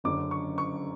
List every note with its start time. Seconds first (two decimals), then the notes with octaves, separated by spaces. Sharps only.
0.04 F#1 F#2 D3 D6
0.31 C#6
0.58 C#6